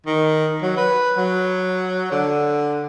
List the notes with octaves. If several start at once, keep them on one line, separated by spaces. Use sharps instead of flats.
D#3
F#3
B4
F#3
D3